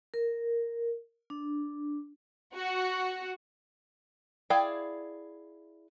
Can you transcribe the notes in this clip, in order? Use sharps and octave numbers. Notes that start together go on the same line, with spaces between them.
A#4
D4
F#4
E4 G#4 D5 F5 G5